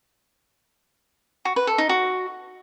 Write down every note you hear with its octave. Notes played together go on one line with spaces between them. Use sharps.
F#4
B4
A4
D#4
F#4